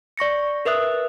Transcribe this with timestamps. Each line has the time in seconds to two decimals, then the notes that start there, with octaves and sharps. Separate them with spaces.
0.17 D5 C#6 A#6 C#7
0.65 A#4 B4 E5 D#6 F#6